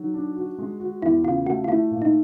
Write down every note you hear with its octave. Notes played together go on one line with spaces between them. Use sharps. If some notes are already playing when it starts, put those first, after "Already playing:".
Already playing: F#3 D#4
D4
F#4
G#3
F#4
E2 E4
C#3 F4
A3 F#4
F4
A3 E4
A#2
D#4